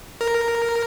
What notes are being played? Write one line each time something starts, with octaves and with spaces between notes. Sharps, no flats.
A#4